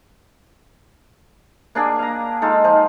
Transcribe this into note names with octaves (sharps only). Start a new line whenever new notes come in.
A#3 D4 G#4
F5 A#5
G#3 D#4 F4 A4
F3 D#4 F4